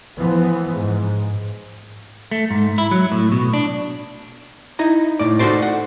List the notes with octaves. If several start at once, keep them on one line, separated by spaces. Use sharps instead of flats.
E3 F3 B3
G#2
A3
G#2
E4
F#3
A2
B2
D4
D#4 E4 D#5 A#5
A2 D5
D#4 F4 F#4 A4 C5 D5
F#5